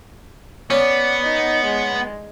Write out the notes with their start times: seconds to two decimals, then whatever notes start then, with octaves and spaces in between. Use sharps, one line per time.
0.71 B3 C#4 D5
1.23 D#4
1.65 G#3